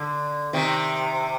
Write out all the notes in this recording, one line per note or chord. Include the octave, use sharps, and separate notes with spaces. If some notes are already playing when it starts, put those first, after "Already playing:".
Already playing: D3
C3 D#3